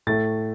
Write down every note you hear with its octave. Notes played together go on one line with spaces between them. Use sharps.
A2 A3 A6